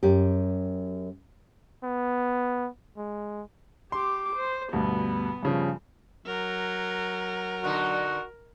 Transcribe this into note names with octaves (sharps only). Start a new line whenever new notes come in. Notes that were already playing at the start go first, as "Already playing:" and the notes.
F#2 G4
B3
G#3
G4 C6 D6
C5
D2 G2 B2 B3
G2 C#3 F3
F#3 A#4
B2 D3 D#4 F#4